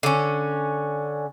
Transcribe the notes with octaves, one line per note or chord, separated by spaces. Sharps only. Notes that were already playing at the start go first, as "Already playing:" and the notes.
D3 C#4